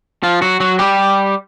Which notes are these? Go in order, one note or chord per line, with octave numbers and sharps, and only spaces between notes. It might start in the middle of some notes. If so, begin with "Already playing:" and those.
F3 F4
F#3 F#4
F#3 F#4
G3 G4